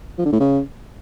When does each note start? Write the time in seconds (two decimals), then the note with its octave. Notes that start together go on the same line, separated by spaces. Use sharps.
0.18 F3
0.25 D3
0.32 A2
0.40 C#3